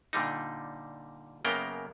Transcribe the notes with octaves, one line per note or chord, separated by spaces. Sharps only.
A#2 D3 G3 D#4
F#2 C#3 A#3 B3 A#4 G5